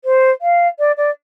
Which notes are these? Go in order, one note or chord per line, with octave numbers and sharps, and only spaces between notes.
C5
F5
D5
D5